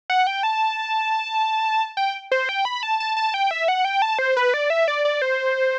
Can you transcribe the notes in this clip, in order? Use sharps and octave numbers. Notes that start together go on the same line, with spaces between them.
F#5
G5
A5
G5
C5
G5
B5
A5
A5
A5
G5
E5
F#5
G5
A5
C5
B4
D5
E5
D5
D5
C5